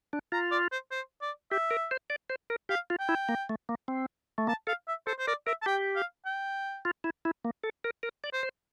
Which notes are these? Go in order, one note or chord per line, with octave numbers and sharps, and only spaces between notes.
D4
F4 A#5
D5
C5
C5
D5
G4 E5
A#4
C5
D5
C5
A#4
G4 F5
F4
G5
E4
A#3
A3
A#3
C4
A3
A#3 A5
A4 F5
E5
A4 C5
C5
A#4 D5
A#4 E5
A5
G4 G5
F5
G5
F4
E4
E4
A#3
A4
A#4
A#4
D5
C5
C5